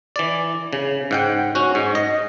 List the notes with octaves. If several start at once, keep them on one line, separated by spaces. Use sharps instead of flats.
E3 D5
C#3
G#2 F#5 G5
C#4 F#4
G#2
D#5